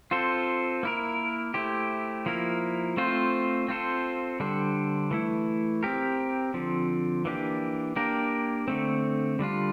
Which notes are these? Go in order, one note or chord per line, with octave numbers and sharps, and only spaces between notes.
C4 F4 A4 C5
A#3 E4 A#4
A3 E4 G4 C5
F3 A#3 E4 A#4
A3 C4 F4 C5
C4 F4 A4 C5
D3 G3 D4 A4 C5
E3 A3 E4
C4 G4 A#4
D3 F3 C4
E3 A#3 D4 G4
A#3 D4 G4 A#4
D3 A3 C4
D3 G3 D4 F4